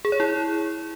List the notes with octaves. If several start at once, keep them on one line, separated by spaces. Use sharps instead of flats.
G#4
C#5
E4